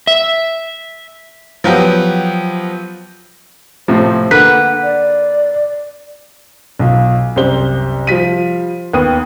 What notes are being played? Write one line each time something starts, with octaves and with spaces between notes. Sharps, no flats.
E5
F3 F#3 B3 G4
A2 C3 F3 C5
D3 A#3 B4 F#5
D5
B1 F4
C2 F#2 G4 C5 G7
F3 G3 B6 D#7
D#2 B3 D#6 D#7